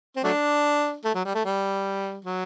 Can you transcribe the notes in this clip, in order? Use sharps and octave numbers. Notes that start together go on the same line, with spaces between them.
C4
F#3 A3 D4
A3
F#3
G3
A3
G3
F#3